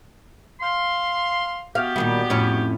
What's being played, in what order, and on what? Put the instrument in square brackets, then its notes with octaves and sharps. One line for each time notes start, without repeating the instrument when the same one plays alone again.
[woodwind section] F5 C6
[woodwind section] B3 F#4 G4 [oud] F5
[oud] A#2 D#3 G3
F2 A2 C#4